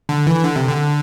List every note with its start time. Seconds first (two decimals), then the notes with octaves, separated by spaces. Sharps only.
0.09 D3
0.27 E3
0.44 D3
0.56 C3
0.68 D3